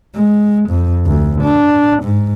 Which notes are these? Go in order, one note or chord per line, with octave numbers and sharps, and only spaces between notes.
G#3
F2
D2
D4
G#2